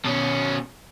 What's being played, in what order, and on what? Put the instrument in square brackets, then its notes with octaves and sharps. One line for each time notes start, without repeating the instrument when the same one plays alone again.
[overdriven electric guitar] B2 C#4